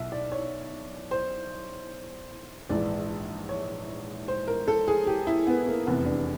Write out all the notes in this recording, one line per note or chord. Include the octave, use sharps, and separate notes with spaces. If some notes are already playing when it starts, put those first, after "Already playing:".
Already playing: B1 B2 E5
D5
C#5
C5
A#1 G#2 E3 D5
C#5
C5
A#4
A4
G#4
G4
E4
B3
A#3
F1 E2 C3 E3 B3
D4